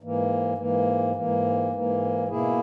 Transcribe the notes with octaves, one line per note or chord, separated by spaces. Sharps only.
G#2 E3 A#3
G#2 E3 A#3
G#2 E3 A#3
G#2 E3 A#3
B2 A#3 E4 G#4